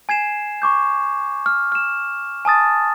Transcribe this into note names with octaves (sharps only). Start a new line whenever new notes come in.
G#5 G#6 C7 E7
C#6 D6 G6
F6
F6 E7
G#5 A5 D#6 A6